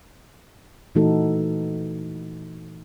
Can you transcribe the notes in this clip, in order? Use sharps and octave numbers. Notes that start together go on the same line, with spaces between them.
A#2 E3 A3 D#4 F#4 A4